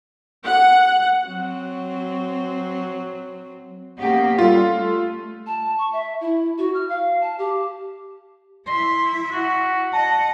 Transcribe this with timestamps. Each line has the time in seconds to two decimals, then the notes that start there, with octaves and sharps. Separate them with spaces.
0.46 F#5
1.26 F#3 C4
3.99 A#3 B3 C#4 G4
4.39 G3 F4 A4
4.73 A3
5.46 A5
5.78 C#6
5.92 E5
6.21 E4
6.58 F#4
6.74 F6
6.88 F5
7.21 A5
7.38 G4
8.67 E4 E5 C6
9.31 F#4
9.93 D#5 F#5 A5